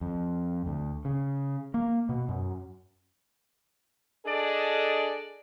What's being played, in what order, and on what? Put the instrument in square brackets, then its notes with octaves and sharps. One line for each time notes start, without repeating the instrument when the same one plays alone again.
[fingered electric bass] F2
D2
C#3
A#3
B2
F#2
[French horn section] D4 G#4 A4 D5 D#5